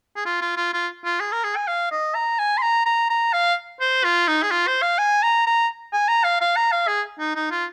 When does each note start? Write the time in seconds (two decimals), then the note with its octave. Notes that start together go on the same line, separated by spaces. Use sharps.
0.16 G#4
0.26 F4
0.41 F4
0.57 F4
0.73 F4
1.05 F4
1.20 G#4
1.32 A#4
1.44 G#4
1.56 G#5
1.67 F5
1.91 D#5
2.15 A#5
2.39 G#5
2.58 C6
2.62 A#5
2.86 A#5
3.10 A#5
3.33 F5
3.81 C5
4.04 F4
4.28 D#4
4.43 G#4
4.51 F4
4.67 C5
4.82 F5
4.98 G#5
5.23 A#5
5.46 A#5
5.93 G#5
6.08 A#5
6.24 F5
6.41 F5
6.56 A#5
6.72 F5
6.88 G#4
7.19 D#4
7.35 D#4
7.51 F4